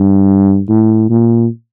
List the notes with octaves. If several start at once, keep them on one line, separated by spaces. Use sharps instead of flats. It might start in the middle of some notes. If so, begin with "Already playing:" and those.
Already playing: G2
A2
A#2